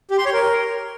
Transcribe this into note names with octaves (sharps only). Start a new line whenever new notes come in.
G4
C6
C#5
A#4